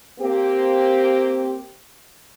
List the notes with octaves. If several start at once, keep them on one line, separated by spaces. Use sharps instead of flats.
A#3 C4 G4